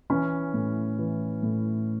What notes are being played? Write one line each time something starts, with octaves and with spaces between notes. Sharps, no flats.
E3 C#4
A2
E3
A2